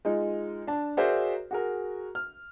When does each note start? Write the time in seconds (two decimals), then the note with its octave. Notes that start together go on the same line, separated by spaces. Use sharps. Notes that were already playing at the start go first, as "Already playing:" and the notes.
0.05 G#3 D#4 F4
0.67 D4 A5
0.97 F#4 G#4 A#4 C5 D5 E5
1.51 F#4 G#4 A#4
2.15 F6